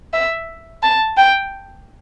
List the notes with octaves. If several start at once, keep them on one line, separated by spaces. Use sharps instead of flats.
E5
A5
G5